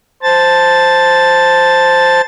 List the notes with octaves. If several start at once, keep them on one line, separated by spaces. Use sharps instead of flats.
C5 A5 A6